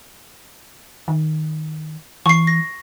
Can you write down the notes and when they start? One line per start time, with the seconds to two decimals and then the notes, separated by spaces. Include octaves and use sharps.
1.08 D#3
2.26 E3 C#6 C7
2.47 A#6